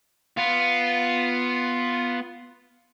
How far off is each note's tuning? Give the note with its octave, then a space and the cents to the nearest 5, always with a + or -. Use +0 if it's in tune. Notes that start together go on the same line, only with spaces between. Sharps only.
B3 +0 F4 +0